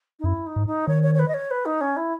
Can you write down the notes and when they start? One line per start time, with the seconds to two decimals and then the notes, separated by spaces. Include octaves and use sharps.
0.19 D#4
0.24 F#2 E4
0.46 D#4
0.56 G#2
0.66 D#4
0.87 D#3 C#5
1.02 C#5
1.14 C#5
1.19 B4
1.28 D#5
1.33 C#5
1.50 B4
1.65 D#4
1.80 C#4
1.96 E4